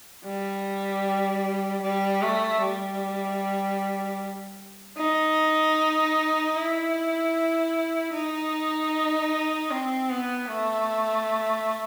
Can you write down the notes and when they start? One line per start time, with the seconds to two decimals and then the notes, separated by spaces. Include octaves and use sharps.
0.25 G3
1.82 G3
2.22 A3
2.61 G3
4.97 D#4
6.56 E4
8.13 D#4
9.71 C4
10.10 B3
10.49 A3